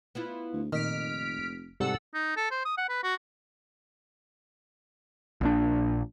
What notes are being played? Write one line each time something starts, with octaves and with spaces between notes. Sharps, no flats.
B3 E4 F4
D2
F1 A#2 D#3 D#5 F6 B6 D7
G#2 C3 G3 A4 F#5 E6
D#4
A4
C5
D#6
F#5
B4
F#4
A#1 A#2 D4